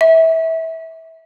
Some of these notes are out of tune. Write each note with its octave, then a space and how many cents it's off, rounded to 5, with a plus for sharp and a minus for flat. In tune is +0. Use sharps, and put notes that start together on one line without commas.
E5 -20